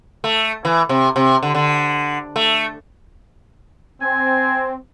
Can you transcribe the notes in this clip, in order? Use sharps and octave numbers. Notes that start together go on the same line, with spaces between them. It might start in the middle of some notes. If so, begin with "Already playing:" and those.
A3
E3
C3
C3
D3
D3
A3
C4 G#5